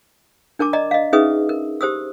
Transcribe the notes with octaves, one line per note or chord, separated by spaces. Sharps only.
D4 A#4 A5 D6
D5 D#5 A#5
D#5 F5
C#4 D#4 G#4 B4 E5 D#6
A#4
G4 C5 D#6 E6